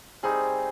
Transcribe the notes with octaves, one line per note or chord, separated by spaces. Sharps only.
G3 C4 D#4 G#4